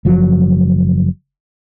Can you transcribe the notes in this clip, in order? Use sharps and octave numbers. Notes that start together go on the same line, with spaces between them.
F#1 F3 F#3